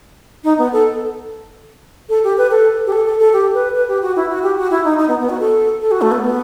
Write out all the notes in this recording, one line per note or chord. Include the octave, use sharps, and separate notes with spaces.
D#4
B3
A4
A4
G4
B4
A4
G4
A4
A4
A4
G4
B4
B4
G4
F#4
E4
F#4
G4
F#4
E4
D#4
D#4
B3
B3
F#4
A4
A4
F#4
A3
B3
B3